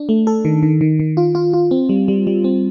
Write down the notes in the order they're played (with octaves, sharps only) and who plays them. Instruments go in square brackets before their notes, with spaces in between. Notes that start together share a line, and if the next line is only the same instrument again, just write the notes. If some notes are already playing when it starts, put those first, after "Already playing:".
Already playing: [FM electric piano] D4
A3
A4
D#3
D#3
D#3
D#3
F4
F4
F4
C4
G3
G3
G3
C4